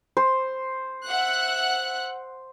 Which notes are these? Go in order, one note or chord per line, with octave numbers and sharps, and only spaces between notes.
C5
E5 F#5 F#6